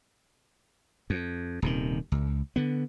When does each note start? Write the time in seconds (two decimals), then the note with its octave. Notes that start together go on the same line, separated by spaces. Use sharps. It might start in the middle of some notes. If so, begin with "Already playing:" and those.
1.10 F2
1.62 D#1 C3 D#3
2.12 C#2
2.56 D3 B3